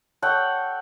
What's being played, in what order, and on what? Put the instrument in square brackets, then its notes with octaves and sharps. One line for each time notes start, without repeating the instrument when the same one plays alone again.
[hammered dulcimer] A4 C#5 F#5 G5